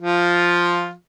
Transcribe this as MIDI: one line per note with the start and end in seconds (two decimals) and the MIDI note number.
0.02 0.92 53
0.02 0.92 65